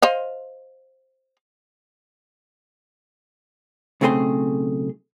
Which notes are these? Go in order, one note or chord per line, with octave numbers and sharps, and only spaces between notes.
C5 D#5 F5
B1 C#3 A3 C4 G#4 C6